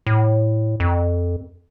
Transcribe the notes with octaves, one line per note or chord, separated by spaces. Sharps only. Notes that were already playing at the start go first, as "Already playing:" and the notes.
A2
F2